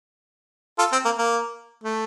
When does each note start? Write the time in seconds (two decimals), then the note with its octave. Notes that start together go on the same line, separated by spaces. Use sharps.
0.79 F4 A4
0.92 C4
1.05 A#3
1.18 A#3
1.84 A3